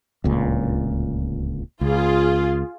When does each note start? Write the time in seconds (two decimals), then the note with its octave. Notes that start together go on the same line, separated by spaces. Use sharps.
0.24 D1 C#2 A#2
1.81 C#2 F4 G#4